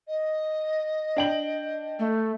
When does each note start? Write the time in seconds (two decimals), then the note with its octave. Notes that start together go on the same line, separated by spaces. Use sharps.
0.08 D#5
1.17 D4 G5 F#7
1.99 A3